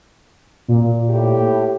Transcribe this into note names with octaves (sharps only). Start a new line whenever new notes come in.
A#2
A2 G4